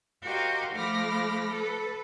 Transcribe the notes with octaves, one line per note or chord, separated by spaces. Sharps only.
F#4 G4 A#4 C5 D#5 F5
F3 A3 B5 D6 F6 A#6
A4 B4